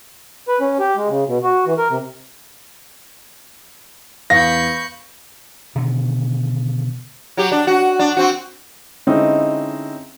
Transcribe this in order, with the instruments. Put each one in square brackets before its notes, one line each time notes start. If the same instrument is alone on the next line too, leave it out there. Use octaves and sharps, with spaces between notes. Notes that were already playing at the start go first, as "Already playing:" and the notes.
[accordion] B4
C#4
G4
G#3
C#3
B2
F#4
E3
A#4
C3
[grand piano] E2 [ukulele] F5 [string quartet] B5 C#6 G6 [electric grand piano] A#6
[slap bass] B2 D3 D#3
[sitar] F#3 G4
D4
F#4
D4
C4 F#4
[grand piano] D3 G#3 C4 C#4 D#4 E4